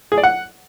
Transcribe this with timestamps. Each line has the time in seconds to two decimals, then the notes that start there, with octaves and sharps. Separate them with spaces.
0.12 G#4
0.18 D5
0.23 F#5